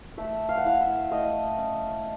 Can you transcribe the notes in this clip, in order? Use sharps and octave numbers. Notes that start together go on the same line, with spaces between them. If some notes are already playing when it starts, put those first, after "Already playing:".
A3 E5
F5
F#5
E4 F5
E5
A3 D#5
C#4